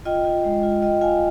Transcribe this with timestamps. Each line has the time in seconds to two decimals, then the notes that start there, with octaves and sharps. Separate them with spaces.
0.05 F4 D#5 G5
0.25 F4
0.44 G#3
0.63 F4
0.82 F4 D#5 G5
1.01 F4 F5 G#5